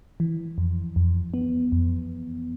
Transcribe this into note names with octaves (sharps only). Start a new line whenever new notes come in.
E3
F2
F2
B3
F2